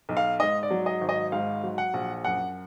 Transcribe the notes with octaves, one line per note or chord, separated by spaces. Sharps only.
B1
F5
G#2 D#5
D5
F#3
D#5
G#1
D#5
G#2 F5
F#3
F#5
A#1
F#2 F#5